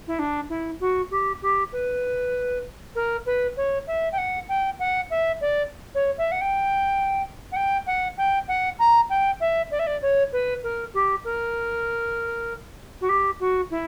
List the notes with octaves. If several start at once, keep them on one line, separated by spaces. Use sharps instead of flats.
E4
D4
E4
F#4
G4
G4
B4
A#4
B4
C#5
E5
G5
F#5
G5
F#5
E5
D5
C#5
E5
F#5
G5
F#5
G5
F#5
G5
F#5
A#5
G5
E5
D5
E5
D5
C#5
B4
A#4
G4
A#4
F#4
G4
F#4
E4